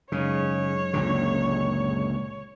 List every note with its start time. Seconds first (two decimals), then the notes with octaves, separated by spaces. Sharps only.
0.12 F#2 C#3 G#3 D#4 C#5
0.94 C#2 A#2 D3